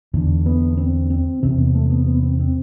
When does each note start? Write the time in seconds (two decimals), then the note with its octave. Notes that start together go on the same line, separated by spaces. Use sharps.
0.13 E2 D3
0.46 B3
0.77 C4
1.10 C4
1.43 E2 C3 C4
1.59 B3
1.75 A3
1.90 B3
2.07 B3
2.23 C4
2.39 C4